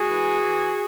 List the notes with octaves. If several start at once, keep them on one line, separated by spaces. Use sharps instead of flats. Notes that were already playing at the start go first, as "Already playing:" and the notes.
Already playing: G#3 F#4 G#4
E3
E3